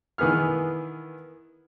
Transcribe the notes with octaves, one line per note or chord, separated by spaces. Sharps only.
D#3 E3 B3 G#4 F6